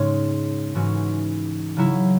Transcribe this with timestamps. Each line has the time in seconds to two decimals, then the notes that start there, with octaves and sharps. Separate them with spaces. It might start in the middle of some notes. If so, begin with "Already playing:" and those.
Already playing: G#2 C#3 G#3 C#4 G#4 C#5
0.75 G#2 E3 C#4 F#4
1.77 C#3 F#3 E4